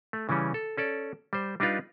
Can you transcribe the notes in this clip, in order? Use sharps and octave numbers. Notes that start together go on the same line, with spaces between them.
A3
C#3 E3 G3 C#4
A4
C#4 A4 D5
G3 C5
G3 D4 D#4 F4 B4 F5